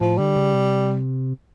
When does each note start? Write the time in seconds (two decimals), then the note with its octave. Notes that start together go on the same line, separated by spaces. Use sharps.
0.01 A2 F3
0.18 D3 G3
0.36 C#3
0.54 C3